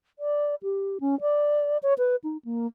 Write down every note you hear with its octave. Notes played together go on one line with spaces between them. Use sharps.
D5
G4
C#4
D5
C#5
B4
D#4
A#3